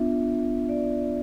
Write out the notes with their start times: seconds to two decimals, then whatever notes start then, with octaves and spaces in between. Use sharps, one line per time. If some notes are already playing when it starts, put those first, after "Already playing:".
Already playing: B3 D4 F4 E5
0.69 D5